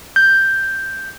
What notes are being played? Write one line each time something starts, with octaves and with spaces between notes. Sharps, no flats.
G6